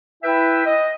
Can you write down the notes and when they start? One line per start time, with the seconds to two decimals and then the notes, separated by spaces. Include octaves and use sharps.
0.24 E4 B4 E5 G5
0.66 D#5